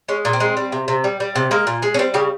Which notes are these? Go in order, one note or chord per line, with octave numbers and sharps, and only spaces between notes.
G#3 C#4
A#2
C4
G#3
G3
C3
C3
G3
G3
C3
G#3 A#3
A#2
G#3
C#4
G3 C4
C#3 G4